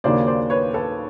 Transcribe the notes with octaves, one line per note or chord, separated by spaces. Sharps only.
D#2 C#3 F#3 A#3 D4 C5 D5
C5 D5
B4 C#5
A4 B4